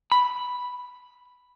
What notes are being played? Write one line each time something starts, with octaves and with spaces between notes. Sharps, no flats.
B5